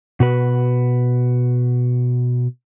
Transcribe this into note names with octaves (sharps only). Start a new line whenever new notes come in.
B2 F#4 B4